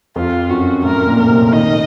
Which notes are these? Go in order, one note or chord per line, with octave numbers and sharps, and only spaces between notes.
F2 F4
F#2 F#4
A2 A#4
A#2
A#4
C3
D#3 D#5